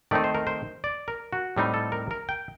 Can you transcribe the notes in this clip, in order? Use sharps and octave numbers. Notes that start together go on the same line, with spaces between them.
D#3 A3 C4 D#4 D5
C5
A#4
C5
D5
A#4
F#4
A2 G3 C4 D#4
A4
A#4
A#4
G5